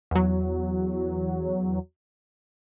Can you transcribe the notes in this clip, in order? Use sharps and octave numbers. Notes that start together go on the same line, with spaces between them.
E2 F#3